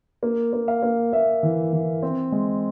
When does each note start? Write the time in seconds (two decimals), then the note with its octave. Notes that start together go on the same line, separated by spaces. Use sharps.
0.23 A#3
0.53 A#3
0.68 F5
0.83 A#3
1.13 A#3 E5
1.43 E3
1.73 E3
2.03 C4
2.32 G#3